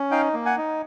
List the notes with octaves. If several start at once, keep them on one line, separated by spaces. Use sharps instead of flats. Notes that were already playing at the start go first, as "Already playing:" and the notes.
Already playing: C#4
D#4 F5 G5
A#3
F#5 G#5
D#4